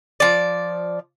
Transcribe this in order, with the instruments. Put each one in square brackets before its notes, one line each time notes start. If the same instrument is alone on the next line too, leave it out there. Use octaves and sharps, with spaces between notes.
[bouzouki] F3 D5